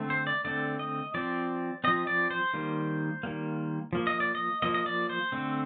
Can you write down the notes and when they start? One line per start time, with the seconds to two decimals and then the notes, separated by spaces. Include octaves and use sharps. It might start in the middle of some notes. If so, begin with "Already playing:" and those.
Already playing: D3 A3 C4
0.10 C5
0.27 D5
0.45 D3 A3 C4 D5
0.79 D#5
1.14 F3 C4 D5
1.84 F3 C4 D#5
2.07 D5
2.31 C5
2.54 D#3 G3 A#3
3.23 D#3 G3 A#3
3.93 F3 A#3
4.07 D#5
4.20 D5
4.35 D#5
4.62 F3 A#3 D#5
4.74 D#5
4.86 D5
5.09 C5
5.32 D3 A3 C4